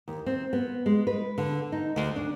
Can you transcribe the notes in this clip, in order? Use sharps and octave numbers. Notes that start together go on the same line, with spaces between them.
D#2
C4
B3
G#3
B4
D3
D#4
D2
D4